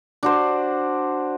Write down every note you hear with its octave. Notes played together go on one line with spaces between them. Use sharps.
D4 F#4 C5